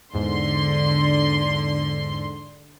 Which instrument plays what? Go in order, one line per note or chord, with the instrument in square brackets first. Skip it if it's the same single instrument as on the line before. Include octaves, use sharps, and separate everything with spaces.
[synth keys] E2 G#2 [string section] D3 C6